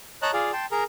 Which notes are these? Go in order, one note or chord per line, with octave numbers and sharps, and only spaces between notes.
C#5 D#5 A5 A#5 F#6
F4 G#4 D5 F5
G5 A5 C6
G#4 A#4 A#5